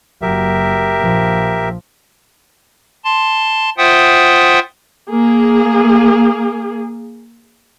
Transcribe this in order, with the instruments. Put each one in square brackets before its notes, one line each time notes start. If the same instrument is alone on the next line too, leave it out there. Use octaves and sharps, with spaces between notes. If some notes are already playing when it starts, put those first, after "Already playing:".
[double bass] F#1 F#3 [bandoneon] G4 A#4 E5
[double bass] A#1 F3
[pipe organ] A5 C6
F4 C5 E5 F#5 G5 D#6
[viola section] A#3 G#4